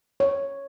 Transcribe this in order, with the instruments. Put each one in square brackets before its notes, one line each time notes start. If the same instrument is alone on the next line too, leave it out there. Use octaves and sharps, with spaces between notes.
[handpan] C#5